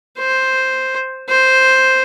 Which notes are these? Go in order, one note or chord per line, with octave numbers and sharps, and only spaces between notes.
C5
C5